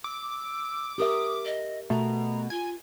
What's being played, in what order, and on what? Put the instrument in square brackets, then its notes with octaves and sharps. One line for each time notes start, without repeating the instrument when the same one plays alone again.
[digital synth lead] D6 [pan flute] E6
[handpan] G4 A#4 E5 [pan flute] D#6
[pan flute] D#5
[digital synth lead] B2 [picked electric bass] A3 [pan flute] A#5
[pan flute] F4 [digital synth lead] G#5